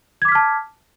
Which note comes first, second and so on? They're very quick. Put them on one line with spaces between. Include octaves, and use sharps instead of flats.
G#6 D6 B6 F6 A5